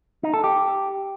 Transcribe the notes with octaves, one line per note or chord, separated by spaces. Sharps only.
D#4
A4
G4